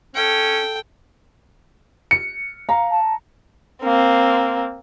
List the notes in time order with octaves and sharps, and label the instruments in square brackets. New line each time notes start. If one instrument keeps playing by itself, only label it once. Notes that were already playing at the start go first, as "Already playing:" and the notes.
[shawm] C#4 [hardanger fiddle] A4 G5
[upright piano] C#7
[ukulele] F5 [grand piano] A#5
[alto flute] A5
[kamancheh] A#3 C4